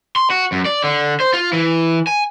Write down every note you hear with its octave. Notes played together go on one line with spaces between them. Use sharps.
C6
F#4
F#2
D5
D3
C5
F4
E3
G#5